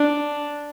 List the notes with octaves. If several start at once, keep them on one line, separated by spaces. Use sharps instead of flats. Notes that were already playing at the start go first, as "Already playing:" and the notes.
Already playing: D4